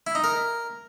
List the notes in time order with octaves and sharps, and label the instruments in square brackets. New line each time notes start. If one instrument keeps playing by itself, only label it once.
[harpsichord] E4
D#4
A#4